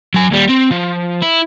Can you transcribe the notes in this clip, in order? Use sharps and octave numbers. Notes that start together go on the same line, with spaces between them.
F#3 G#5
D#2 G3
C4
F3
E4